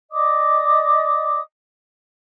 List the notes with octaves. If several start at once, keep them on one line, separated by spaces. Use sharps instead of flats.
D5 D#5 D6 D#6